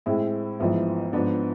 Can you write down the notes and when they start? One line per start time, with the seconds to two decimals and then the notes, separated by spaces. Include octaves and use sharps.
0.06 A2 G#3 C4 E4
0.59 A1 G#2 F3 B3 E4
1.13 G#2 F3 B3 D4